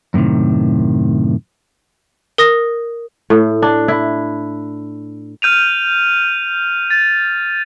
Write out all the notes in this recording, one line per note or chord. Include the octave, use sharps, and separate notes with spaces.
F#2 A2 C3 D#3
A#4 D#6 A#6
A2
D4
E4
F6 G6 D#7 F7
A6